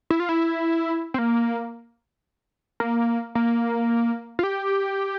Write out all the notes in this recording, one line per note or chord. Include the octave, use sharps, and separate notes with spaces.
E4
F4
E4
C4
A#3
A#3
A#3
F4
G4